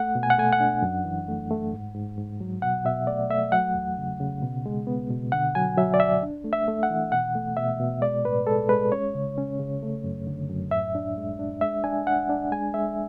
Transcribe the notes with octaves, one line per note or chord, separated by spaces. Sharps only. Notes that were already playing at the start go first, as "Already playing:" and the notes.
Already playing: A3 F#5
B2
G#5
F#5
A3 G#5
F#5
D4
F#2
E3
A3
A3
G#2
G#2
G#2
F#3
B2 F#5
B2 E5
A3 D5
A3 E5
F#3 F#5
E2
C#3
C#3
B2
G#3
B3
B2
D3 F#5
F#3 G#5
F#3 E5
D5
D2 E5
D4
A3
E5
A3
F#5
E3
B2 F#5
A3
B2 E5
B2
G#3 D5
A2 B4
G#3 A4
G#3 B4
C#4 C#5
C#3
C#4
C#3
A3
F#2
D3
F#2
A2 E5
D4
G#3
D4
G#3 E5
D4 G#5
D4 F#5
D4
G#3 G#5
G#3 E5